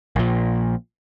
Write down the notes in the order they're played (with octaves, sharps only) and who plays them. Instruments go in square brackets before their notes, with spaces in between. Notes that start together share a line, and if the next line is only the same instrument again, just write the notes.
[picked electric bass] A#1 A#2